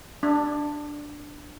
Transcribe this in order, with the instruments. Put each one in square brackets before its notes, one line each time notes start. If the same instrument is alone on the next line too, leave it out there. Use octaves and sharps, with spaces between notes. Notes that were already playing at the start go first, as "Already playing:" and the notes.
[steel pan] D4